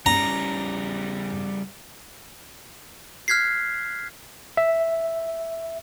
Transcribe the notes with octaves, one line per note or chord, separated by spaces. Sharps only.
C#3 G3 A#5
F6 F#6 G#6 B6 C7
E5